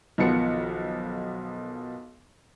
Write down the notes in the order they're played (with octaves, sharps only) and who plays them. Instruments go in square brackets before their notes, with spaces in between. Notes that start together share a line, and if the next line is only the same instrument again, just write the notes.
[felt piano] B1 D#3 F3 B3 C#7